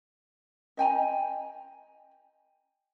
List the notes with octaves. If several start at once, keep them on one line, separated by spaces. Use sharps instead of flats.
D#5 G5 G#5 A#5